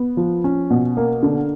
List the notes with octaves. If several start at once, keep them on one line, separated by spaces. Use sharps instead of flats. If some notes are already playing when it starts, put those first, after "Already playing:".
Already playing: B3
F3
C#4
B2
A#3
D3